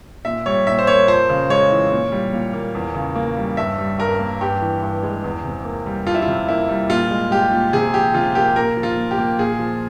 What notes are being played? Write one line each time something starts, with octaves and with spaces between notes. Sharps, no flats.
A#2 E5
G3 C#5
A#2 E5
C5
A#3 C#5
F2 C5
C#3
G#3 C#5
E3
A#2
G3
A#2
A#3
E2
C#3
A#3
G3
G2 E5
G3
G2 A#4
A#3
G2 G4
E3
G2
G#3
E2
C3
A#3
G3
F2 F4
E4
F4
C3
A#3 E4
G3
A#2 F4
G#3
G#3 G4
A#2
C3 G#4
F3 G4
C3 F4
A#3 G4
A#2 A#4
F3
F4
A#2
G4
A#3
A#2 G#4
F3